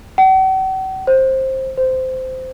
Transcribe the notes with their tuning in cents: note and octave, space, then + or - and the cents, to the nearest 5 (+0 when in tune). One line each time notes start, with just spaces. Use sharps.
F#5 +45
C5 +15
C5 -15